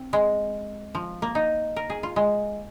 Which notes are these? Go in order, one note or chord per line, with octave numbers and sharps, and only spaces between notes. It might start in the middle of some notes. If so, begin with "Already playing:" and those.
Already playing: C4
G#3
F3
A#3
D#4
A#4
G#4
F4
G#3